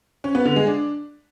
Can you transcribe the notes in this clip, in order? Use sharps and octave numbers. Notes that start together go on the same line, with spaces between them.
C#4
B3
D3
G#3
D4